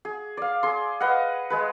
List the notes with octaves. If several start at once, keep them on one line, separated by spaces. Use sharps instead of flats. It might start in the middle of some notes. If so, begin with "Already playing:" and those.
G#4
D5 F5
G#4 C6
B4 D#5 F5 F#5
G#3 G#4 B4